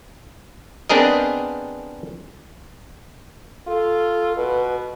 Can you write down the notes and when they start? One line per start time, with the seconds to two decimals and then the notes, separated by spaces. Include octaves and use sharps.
0.89 B3 C4 D4 G#4 A#4 D#5
3.67 F4 A4
4.37 B2 B4